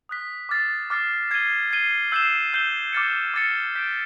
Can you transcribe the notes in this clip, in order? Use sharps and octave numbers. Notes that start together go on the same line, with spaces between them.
D#6 F#6 B6
D6 F6 A6 C7
D6 F6 A6 C7
G#6 C7 D#7 G7
G#6 C7 D#7 G7
E6 G6 C7 E7 G7
E6 G6 C7 E7 G7
D6 F6 A6 C#7
D6 F6 A6 C#7
G6 B6 D7